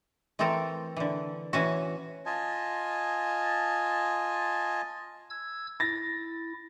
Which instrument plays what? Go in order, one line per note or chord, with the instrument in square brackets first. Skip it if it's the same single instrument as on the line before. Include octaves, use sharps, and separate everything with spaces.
[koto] E3 A3 C4 A4 A#4
D3 E3
E3 C#4 F#4
[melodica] F4 D#5 G#5 A5
[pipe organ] E6 G#6
[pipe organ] E4 [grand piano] A6 A#6